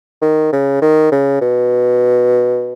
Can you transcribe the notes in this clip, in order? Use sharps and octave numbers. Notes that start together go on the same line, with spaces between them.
D#3
C#3
D#3
C#3
B2